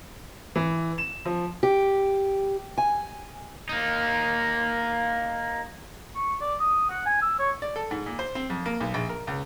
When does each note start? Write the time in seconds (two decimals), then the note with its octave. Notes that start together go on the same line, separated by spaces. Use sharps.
0.56 E3
0.98 E7
1.25 F3
1.63 G4
2.78 G#5
3.69 A#3 D#4
6.15 C#6
6.41 D5
6.60 D#6
6.90 F#5
7.06 G#5
7.22 E6
7.39 C#5
7.62 D5
7.76 A4
7.91 G#2
8.06 A#2
8.19 C5
8.35 C4
8.50 F2
8.66 A#3
8.80 B1
8.94 A#1
9.09 A#4
9.27 C#2